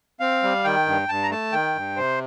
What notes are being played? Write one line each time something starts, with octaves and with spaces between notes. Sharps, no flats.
C4 F5
G3
D#3 G5
G2
G2 A5
A#5
A3 A5
D#3 G5
G2
C3 C5